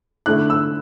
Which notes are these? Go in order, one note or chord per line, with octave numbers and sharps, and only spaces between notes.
D3 A3 E4 F#6
E6